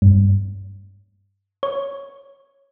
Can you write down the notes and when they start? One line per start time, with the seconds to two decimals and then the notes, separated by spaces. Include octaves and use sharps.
0.02 G2
1.63 C#5